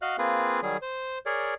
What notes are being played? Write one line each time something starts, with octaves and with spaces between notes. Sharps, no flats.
F#4 D#5 F5 F6 F#6
A#3 C4 F4 G#4 B4
D#3 F#3 G3 G#4
C5
G#4 A#4 C#5 D5